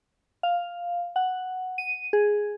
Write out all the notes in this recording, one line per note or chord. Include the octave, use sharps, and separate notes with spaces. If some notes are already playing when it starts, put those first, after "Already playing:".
F5
F#5
D#7
G#4